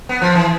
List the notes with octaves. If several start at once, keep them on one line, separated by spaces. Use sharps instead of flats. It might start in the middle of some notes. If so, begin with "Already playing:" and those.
B3
F3
E3